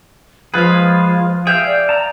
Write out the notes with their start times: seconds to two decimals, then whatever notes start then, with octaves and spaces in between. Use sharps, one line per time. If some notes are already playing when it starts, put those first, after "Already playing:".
0.54 F3 G#3 F4 G#4 B4 F5
1.47 G#4 E5 F5 G5
1.66 D5
1.89 A5 A#5